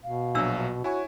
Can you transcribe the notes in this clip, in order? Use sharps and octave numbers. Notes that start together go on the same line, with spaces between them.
B2 F5
A#1 F#3 D4 E6
E4 F#4 C#5 G#5 C#6